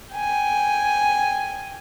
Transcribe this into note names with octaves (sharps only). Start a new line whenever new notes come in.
G5 G#5